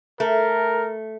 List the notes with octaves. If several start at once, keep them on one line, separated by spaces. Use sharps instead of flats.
A3 A#4